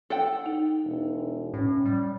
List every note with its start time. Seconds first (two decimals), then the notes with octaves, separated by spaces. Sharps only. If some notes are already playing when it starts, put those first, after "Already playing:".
0.10 A4 F#5 G5
0.46 D#4
0.84 E1
1.54 A2 C#4
1.85 G3